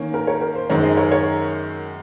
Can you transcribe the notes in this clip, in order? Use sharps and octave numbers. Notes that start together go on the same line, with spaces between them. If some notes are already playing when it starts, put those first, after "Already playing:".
Already playing: D#3 A#3 C#4
A#4
A#4 C#5
A#4
C5
F#2 D#3 G#3 A#4 C#5
C5 D#5
A#4 C#5
A#4 C#5